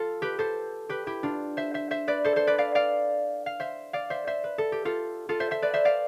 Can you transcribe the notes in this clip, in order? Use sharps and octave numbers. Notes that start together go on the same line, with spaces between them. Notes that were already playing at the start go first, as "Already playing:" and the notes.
Already playing: F4 A4
G4 B4
A4 C5
G4 B4
E4 G4
D4 F4
C5 E5
C5 E5
C5 E5
B4 D5
A4 C5
A4 C5
B4 D5
D5 F5
D5 F5
F5
C5 E5
D5 F5
C5 E5
C5 E5
B4
A4
G4
F4 A4
F4 A4
C5 E5
C5 E5
B4 D5
C5 E5
D5 F5